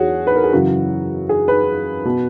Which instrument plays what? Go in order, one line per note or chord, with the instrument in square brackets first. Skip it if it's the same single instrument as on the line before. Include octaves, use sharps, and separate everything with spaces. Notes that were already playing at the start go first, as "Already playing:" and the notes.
Already playing: [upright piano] E2 F#4 G#4 C#5
B4
A#4
G#4
F#2 C#3 E3 F#4
G#4
B4
B2